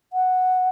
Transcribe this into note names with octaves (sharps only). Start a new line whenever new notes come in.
F#5